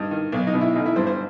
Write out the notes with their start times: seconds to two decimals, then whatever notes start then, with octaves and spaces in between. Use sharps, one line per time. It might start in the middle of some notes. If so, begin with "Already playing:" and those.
Already playing: G2 D#4
0.11 D#3
0.32 B1
0.47 D#4
0.54 B2
0.61 E4
0.76 A1 D#4
0.86 E4
0.96 G2 C5
1.07 C5